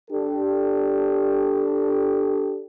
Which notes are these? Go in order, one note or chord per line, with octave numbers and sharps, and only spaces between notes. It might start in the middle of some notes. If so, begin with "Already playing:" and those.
D4 G4 A4